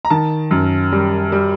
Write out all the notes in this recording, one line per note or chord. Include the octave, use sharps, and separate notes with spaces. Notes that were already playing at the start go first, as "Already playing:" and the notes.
A#5
D#3 A5
F#2
G3
G3